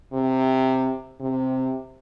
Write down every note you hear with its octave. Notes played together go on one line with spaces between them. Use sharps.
C3
C3